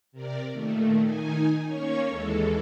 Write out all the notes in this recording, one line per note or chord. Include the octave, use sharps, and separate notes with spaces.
C3 A#4 D5
A#2 D#3 A3
D#3 D#4 G#5
A#3 C#4 C#5 C#6
D#2 E3 G#3 A4